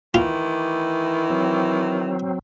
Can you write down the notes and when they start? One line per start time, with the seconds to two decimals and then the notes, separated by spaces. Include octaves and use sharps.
0.14 D#3 E3 F4
1.30 F#3 C4